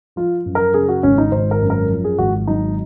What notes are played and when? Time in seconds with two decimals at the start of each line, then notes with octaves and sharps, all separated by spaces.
0.16 F3 F4
0.46 F#2
0.55 A#4
0.74 C#3 G#4
0.89 F#4
1.03 G#1 C#4
1.18 D#4
1.31 G#1 C5
1.51 A#4
1.62 F#2
1.70 A#4
1.90 F3
2.04 G#4
2.18 G#1 F#4
2.47 F#3 D#4